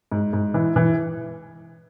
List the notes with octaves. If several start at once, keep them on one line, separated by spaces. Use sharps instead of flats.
G#2
G#2
E3
E3